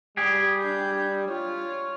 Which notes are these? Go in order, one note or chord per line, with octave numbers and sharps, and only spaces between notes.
G3 G4 G#4
D4 G6
F4 C#5